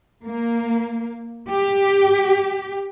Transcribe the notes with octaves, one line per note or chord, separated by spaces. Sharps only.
A#3
G4